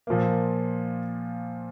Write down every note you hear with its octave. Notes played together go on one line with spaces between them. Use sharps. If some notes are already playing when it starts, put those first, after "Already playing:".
A#2 F3 A#3